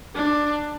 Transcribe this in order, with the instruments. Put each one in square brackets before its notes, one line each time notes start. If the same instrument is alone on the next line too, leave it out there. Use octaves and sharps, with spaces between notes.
[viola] D4